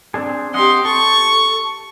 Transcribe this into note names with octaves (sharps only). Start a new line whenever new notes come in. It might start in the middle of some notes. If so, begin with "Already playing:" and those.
C4 D4 G#4
C4 G4 D#5 F#5 C6
A4 C#6